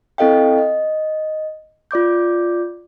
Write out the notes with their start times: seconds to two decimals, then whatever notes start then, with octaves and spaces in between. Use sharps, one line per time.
0.18 C4 E4 A4 D#5 F5 G5
0.58 D#5
1.91 F4 D5 D6 G6